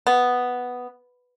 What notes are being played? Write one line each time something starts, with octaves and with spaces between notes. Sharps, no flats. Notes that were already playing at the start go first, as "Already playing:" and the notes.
B3